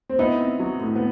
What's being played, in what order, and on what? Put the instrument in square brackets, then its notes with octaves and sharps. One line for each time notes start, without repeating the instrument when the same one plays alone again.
[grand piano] C4
[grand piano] B3 D#4 [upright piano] E4
[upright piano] C4
F#3
A2
[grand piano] B3